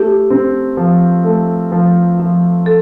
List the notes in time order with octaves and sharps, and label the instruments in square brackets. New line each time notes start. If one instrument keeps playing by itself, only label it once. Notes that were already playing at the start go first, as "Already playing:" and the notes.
Already playing: [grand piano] A3 [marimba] G4
[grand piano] C4
F3
A3
F3
F3
[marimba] A4